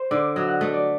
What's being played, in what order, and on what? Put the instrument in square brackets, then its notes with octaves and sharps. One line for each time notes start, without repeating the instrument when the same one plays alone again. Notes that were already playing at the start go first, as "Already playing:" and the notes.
Already playing: [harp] C5
[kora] D3 [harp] D5
[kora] F#3 [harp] D#5
[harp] F#5
[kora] A3 [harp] D#5
[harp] D5